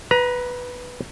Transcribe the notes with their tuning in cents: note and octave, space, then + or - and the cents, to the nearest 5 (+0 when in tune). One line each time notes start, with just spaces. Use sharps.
B4 +0 A#5 +30